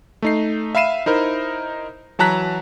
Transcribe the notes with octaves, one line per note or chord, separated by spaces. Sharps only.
A3 D#4 C7
E5 F5 B5 C7 D#7 E7
D#4 E4 A#4 C5
E3 F#3 A5 A#5 F#6 B6